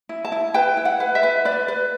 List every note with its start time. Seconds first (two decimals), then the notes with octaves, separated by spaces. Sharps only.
0.09 E4
0.25 A5
0.32 E4
0.54 B4 G5
0.77 E4
0.85 F#5
1.00 B4
1.15 E5
1.23 B4
1.45 B4 D5
1.68 B4